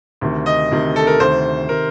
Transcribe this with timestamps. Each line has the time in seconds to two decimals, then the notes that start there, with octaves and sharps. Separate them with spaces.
0.21 D2 C3 D#3
0.46 D#5
0.71 D2 C3 D#3
0.96 A4
1.07 A#4
1.20 D2 C3 D#3 C5
1.69 C3 D#3 A#4